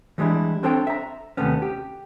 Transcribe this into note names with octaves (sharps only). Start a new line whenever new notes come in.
E3 G3 G#3 D4 E4
C4 D4 A4 C5 C#5 G5
E5 A#5
D#2 C3 A3 B3 C#4
G4